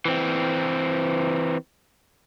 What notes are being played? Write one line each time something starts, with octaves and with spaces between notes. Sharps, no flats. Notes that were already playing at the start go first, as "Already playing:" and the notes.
E3 C4